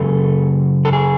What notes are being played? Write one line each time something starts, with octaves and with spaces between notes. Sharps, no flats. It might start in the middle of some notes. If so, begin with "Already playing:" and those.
Already playing: F#2 C#3 A4
A4
G#4